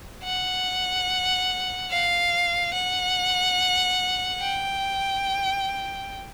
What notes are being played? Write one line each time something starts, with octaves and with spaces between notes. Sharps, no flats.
F#5
F5
F#5
G5